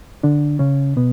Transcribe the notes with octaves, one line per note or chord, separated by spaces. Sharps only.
D3 D4
C#3 C#4
B2 B3